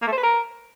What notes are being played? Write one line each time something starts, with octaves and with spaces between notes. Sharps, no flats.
A#3
A3
C5
B4
A#4